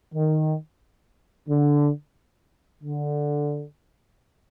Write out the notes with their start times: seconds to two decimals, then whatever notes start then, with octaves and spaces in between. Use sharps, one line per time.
0.14 D#3
1.48 D3
2.82 D3